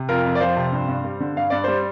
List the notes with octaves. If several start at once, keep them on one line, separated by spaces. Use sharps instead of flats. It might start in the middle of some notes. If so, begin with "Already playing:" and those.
Already playing: C3
F2 F4 A#4
F2
D5
F3 C5 F5
C3
G2
G2
G3
D3
G2 F5
G2 D5
G3 C5